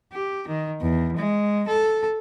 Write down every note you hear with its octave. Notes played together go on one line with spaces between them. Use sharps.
G4
D#3
E2
G#3
A4